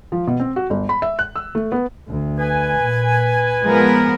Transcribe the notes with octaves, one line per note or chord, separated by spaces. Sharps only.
F3
B2
C4
F#4
G1
B5
E5
F#6
E6
A3
B3
D2
B4 G#5
A#2
F3 G#3 B3 A#4